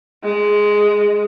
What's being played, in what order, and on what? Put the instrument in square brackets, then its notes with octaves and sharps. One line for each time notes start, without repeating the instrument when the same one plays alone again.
[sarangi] G#3